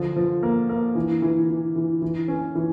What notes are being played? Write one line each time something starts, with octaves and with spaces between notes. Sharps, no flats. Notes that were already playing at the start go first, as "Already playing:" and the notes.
Already playing: D3 F3
F3
A#3
A#3
E3
E3
E3
E3
E3
C#4
E3